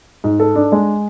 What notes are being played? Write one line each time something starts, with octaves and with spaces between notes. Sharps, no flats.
G#2
A4
D4
G#3